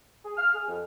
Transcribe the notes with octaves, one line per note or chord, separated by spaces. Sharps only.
G#4
F6
G#4
F2